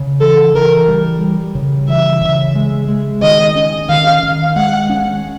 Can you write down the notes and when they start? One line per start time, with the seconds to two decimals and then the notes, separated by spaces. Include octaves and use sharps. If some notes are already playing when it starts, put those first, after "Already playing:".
Already playing: C#3
0.21 E3 A4
0.54 E3 A#4
0.88 G3
1.21 G3
1.55 C#3
1.88 E3 E5
2.21 C#3
2.55 G#3
2.88 G#3
3.22 D#3 D#5
3.56 C#4
3.89 D#3 F5
4.23 D#3
4.56 G#3 F#5
4.90 C#4